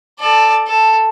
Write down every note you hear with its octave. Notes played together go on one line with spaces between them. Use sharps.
A4 D5
A4